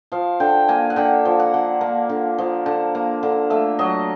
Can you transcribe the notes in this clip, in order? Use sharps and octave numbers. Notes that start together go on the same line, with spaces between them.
F3 F5
D3 G5
A#3 G#5
F#5
D3 G5
F3
F#5
D3
A#3
D3
F3
D3
A#3
D3
A3 E5
F#3 D#5